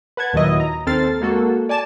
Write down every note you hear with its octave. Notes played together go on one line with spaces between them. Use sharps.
B4 F#5 A5 G#6
D#2 A#2 D#3 F#3 E4 D#5
A#5
D#2 C4 A4 F6 A6 C7
G#3 A#3 F#4 A4
D5 G#5 A5 E7